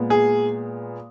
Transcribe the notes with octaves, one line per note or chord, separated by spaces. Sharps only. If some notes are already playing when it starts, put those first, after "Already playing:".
Already playing: A#2 G#3 B3
G#4